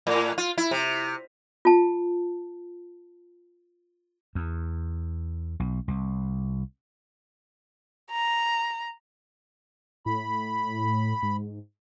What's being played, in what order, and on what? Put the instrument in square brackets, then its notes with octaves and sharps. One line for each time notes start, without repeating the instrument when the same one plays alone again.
[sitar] A2
F4
E4
C3
[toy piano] F4 A5
[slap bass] E2
B1
C2
[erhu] A#5
[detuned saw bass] A2 [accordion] B5
[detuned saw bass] G#2